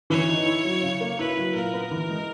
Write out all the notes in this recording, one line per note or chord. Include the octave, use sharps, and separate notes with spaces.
E3 C#5
D#4
E4
F#3
C#3
A#3
E4 B4
F#3
A#2 A#4
B3
E3
G#3